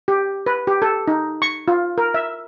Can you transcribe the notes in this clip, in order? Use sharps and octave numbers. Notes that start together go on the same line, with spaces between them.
G4
B4
G4
A4
D#4
C#6
F4
A#4
E5